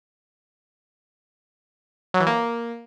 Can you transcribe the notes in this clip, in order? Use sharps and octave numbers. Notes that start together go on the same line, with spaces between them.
F#3
E3
A#3